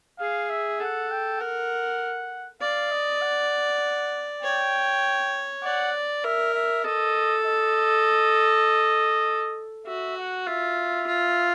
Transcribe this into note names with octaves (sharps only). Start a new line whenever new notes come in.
G#4 F5
E5
A4 F#5
G5
A#4 F#5
D5 F5
D#5
F#5
C#5 G5
D5 F#5
A#4 E5
E5
A4 D#5
D#5
F#4 E5
F#5
F4 E5
F4